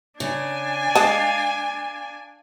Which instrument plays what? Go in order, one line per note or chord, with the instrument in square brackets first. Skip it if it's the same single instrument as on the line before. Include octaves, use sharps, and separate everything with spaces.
[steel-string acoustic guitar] C#3 [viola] D4 G#5
[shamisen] G#3 D#5 A5 [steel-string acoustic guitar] F5